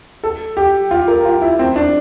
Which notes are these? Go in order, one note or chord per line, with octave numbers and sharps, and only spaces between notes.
A4
G4
F4
A#4
F4
E4
C4
D4